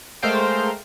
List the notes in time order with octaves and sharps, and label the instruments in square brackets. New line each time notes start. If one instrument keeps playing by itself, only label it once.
[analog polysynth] G#3 A3 A#4 C5 F5 G5